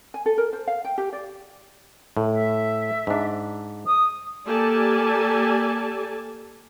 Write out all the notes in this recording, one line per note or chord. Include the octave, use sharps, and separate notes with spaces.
G#5
A4
A#4
C5
F5
G5
G4
D5
A2
E5
G#2 D4
D#6
A#3 G4 A4 D5 G#5 A5